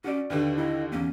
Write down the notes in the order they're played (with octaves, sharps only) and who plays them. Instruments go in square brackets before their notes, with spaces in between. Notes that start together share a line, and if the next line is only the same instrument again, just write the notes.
[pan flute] C#4 [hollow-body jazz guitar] F#4 D5
[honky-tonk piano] D#2 D3 [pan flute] B4
[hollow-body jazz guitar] E4 A4 B5 [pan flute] D#5
[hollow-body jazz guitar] E2 A#3 [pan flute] C#4